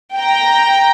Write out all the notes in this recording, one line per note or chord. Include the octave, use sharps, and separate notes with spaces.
G5 A#5